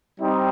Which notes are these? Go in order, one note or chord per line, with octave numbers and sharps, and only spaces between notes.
G3 C4 D#4